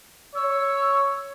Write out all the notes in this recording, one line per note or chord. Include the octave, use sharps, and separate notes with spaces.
C#5 E6